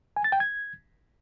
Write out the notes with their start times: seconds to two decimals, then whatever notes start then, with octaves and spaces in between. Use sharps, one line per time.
0.16 G#5
0.24 A6
0.32 G5
0.40 G#6